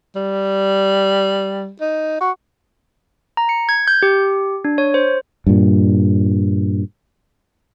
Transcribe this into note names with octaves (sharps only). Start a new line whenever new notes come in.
G3
D#4
F#4
A#5
C#7
G#6
G6
G4
D4
C#5
C5
G2 A#2